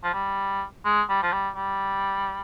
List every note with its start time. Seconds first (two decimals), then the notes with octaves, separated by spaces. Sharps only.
0.03 F3
0.13 G3
0.85 G#3
1.09 G3
1.23 F3
1.32 G3
1.56 G3